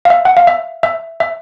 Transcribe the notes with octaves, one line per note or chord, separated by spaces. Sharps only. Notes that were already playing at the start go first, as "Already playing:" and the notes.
F5
E5
F#5
F5
E5
E5
E5